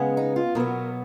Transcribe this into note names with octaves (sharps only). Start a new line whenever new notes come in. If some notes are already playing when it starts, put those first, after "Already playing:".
Already playing: C#3 G#3 B3
D#4
F4
B2 F#3 B3 A#4